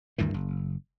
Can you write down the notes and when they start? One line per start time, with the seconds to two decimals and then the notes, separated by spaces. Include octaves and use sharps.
0.18 D2 G2 D#3 E3
0.34 F#1